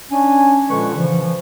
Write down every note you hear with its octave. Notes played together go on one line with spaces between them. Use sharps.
C#4 D4 G#5
A#2 D3 F3 G#3 B4 C#6
C#3 E3 F3